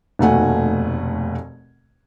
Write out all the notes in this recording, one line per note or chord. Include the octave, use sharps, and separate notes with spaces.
F1 D#2 B2 A3 F#5 G#5